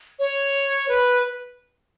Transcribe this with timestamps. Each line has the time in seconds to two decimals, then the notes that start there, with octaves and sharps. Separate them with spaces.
0.19 C#5
0.88 B4